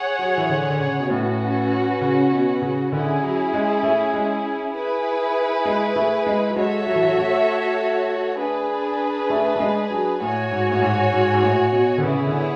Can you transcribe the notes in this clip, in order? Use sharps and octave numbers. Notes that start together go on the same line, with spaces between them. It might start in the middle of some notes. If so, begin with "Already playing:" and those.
Already playing: G#4 C#5 F#5
F#3
E3
D3
D3
C#3
B2
A2 C#4 F#4 B4
C#3
B2
C#3
D3 C#4 E4 G#4
F#3
G#3
A3
G#3
E4 G#4 B4
G#3
A3
G#3
F#3
G#3 F#4 A4 C#5 E5
F#3
E3
F#3
A3
D4 G#4 B4
A3
A3
G#3
F#3
A2 F#4 C#5 G#5
G#2
A2
G#2
G#2
G#2
A2
B2
D3
C#3 B3 E4 G#4 C#5
D3